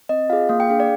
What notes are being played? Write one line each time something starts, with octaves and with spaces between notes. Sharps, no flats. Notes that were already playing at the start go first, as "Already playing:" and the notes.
C4 D#5
F4 G#4 F5
A#3 F5
G5
D4 G#4 F5
D5